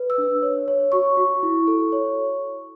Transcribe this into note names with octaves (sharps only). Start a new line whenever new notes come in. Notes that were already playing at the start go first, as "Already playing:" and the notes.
Already playing: B4
E6
D4
C#5
C#5
F#4 C#6
F#4
E4
A4
C#5